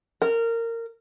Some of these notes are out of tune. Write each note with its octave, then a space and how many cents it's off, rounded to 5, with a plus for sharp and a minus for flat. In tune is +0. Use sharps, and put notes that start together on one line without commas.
A#4 -20